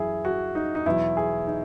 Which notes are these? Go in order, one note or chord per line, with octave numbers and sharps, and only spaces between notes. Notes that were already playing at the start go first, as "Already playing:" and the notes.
Already playing: F#2 E3 E4 G#4
F#4
D#4
D#4
E2 B2 F#3 E4
G#4
D#4